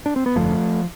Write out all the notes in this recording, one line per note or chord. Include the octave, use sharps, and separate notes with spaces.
D4
C4
B3
G1 F2 D3 F3 A3